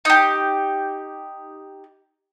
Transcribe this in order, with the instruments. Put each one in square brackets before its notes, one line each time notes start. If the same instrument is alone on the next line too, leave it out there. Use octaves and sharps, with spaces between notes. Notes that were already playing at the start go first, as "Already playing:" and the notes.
[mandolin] D#4 G4